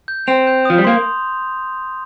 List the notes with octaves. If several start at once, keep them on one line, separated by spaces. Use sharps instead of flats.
G6
C4 F7
G6
F3 D#6
G3
A#3 C6